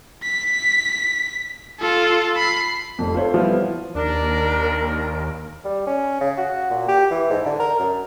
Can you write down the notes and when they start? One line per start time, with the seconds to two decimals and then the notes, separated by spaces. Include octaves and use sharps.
0.23 B6
1.80 F4 A4
2.36 B5 C7
2.99 F1 F2
3.14 F4 A4 C5 C#5
3.34 E3 F3 G3 B3 E4 F4
3.95 D#2 D4 A#4
5.64 G3
5.87 C#4
6.20 C#3
6.38 F#4
6.70 A#2
6.88 G4
7.11 E3
7.30 G#2
7.45 D3
7.60 A#4
7.79 F#2